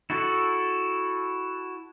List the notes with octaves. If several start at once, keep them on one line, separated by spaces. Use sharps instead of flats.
E4 F#4 A4